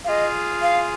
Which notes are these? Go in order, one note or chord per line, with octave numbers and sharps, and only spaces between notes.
F5
F4 G#4 D#5
F5